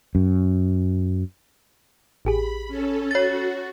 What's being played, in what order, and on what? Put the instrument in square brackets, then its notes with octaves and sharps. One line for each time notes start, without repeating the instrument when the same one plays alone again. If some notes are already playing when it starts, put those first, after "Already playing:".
[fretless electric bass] F#2
[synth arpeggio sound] A1 G4 G#4 [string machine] B5
[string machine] C#4 A4
[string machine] F#4 [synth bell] C#5 A6